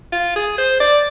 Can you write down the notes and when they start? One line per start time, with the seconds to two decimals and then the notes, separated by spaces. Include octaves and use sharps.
0.12 F4
0.36 G#4
0.58 C5
0.80 D5